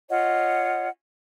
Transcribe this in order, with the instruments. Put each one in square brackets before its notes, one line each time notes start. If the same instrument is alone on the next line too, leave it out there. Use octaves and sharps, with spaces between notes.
[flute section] F4 C#5 D#5 F#5